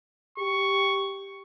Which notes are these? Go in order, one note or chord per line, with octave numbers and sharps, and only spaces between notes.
G4 C#6